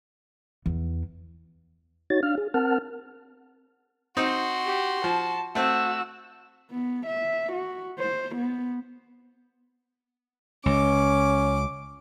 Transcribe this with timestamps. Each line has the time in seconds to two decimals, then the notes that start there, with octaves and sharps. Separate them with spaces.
0.66 E2
2.10 D#4 F#4 C#5 A6
2.23 D4 F5 F6
2.38 G#4
2.54 C4 A#4 F#5 A5 F6
4.17 C4 D#4 F#4 C6
4.65 G4
5.04 F3 A5
5.55 A3 C4 F#4 E6
6.71 B3
7.06 E5
7.52 F#4
7.99 C5
8.35 B3
10.66 C#2 C#4 D6